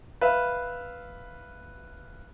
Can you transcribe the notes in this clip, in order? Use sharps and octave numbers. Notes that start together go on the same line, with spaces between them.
B4 E5 F5